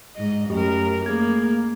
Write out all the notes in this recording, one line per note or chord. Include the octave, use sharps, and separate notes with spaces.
G#2 D#5
F#2 A3 G4 A#4
A3 A#3 G#4 G#6